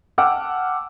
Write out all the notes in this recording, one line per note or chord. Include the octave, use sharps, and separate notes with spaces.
F#5 G5 A5 D6 E6 F6